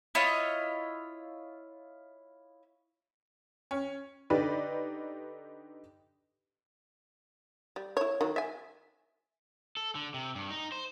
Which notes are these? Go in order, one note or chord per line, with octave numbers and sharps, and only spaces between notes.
E4 F4 C#5 D#5
C#4
D3 D#4 G4 B4 D5
G3
E4 C#5
D#3 F#3
E5 G#5
A4
D3
C3
G2
D#4
C5